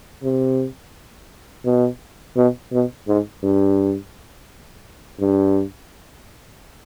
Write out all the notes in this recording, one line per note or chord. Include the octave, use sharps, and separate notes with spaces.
C3
B2
B2
B2
G#2
G2
G2